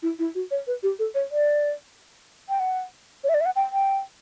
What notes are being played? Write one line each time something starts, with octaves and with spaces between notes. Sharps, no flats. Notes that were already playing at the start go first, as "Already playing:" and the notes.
E4
E4
F#4
C#5
B4
G4
A4
C#5
D5
G5
F#5
C#5
E5
D5
E5
F#5
G5
G5